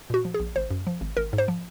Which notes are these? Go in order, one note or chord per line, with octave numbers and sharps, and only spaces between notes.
A#2 F#4
F3
G#4
A#1
G#1 C5
F#2
F3
G#1
G#1 A#4
G#2
C5
F3